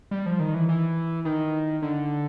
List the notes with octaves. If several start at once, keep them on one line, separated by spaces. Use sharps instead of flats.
G3
F3
D#3
E3
E3
D#3
D3